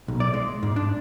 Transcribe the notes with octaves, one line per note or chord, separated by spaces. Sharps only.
B1
D5
G#3
G#2
D4